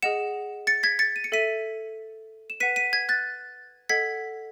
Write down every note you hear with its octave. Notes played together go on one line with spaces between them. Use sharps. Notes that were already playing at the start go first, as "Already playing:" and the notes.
G#4 D#5 F#5 C#7 E7
A6 C#7
G#6 B6
A6 C#7
D#7
C#7
A4 E5 B6 D#7
E7
B4 F#5 B6 D#7
B6 D#7
G#6 B6
F#6 A6
A4 D#5 F#5 G#6 B6